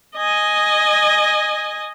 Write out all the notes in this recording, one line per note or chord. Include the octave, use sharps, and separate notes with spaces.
D#5 G#5